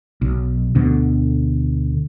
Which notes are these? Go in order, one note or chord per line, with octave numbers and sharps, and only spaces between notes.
B1
D2 B2 D3